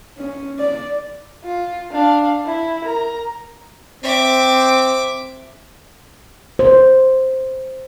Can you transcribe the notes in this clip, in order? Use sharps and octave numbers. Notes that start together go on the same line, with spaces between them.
C#4
D5
F4
D4 F5
E4
A#4 A#5
C4 E5 D6
C5